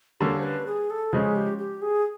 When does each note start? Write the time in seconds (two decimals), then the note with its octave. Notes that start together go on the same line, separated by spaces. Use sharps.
0.20 D3 G3 A#3 C#4 A4
0.39 C5
0.43 B4
0.66 G#4
0.90 A4
1.13 C#3 F3 G#3 C#4 G#4
1.35 G4
1.58 G4
1.82 G#4